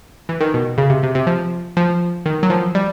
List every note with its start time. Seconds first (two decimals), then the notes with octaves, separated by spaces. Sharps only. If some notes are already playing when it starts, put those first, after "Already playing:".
0.29 E3
0.41 D#3
0.54 B2
0.78 C#3
0.90 C3
1.03 C3
1.15 C3
1.27 F3
1.77 F3
2.26 D#3
2.43 F#3
2.50 F3
2.75 G3